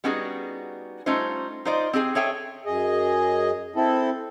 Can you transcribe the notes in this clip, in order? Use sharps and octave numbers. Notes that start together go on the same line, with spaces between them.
G3 B3 C#4 D#4 F#4 G#4
G3 A3 C#4 D#4 F4 C5
D#4 F4 C5 D5 D#5
C4 G4 G#4 G#5
G#4 A4 C#5 E5 G5 G#5
F#2 G#4 D#5
C4 E4 A4